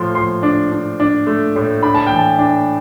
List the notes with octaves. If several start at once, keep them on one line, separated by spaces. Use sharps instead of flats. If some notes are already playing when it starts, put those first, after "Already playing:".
Already playing: A2 F3 C6
F3 C6
D4
D4
D4
A3
A2
D4 B5
A5
G5
E3
A5
D4